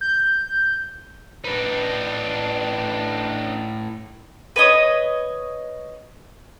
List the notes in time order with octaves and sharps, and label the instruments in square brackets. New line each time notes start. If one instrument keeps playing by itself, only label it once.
[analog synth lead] G6
[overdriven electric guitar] A2 B4 [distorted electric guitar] D4 D#4
[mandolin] B4 C#5 D#5 D#6